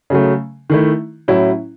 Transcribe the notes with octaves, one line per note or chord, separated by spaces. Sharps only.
C#3 F#3 A3
D#3 A3 E4
A2 F#3 C#4 E4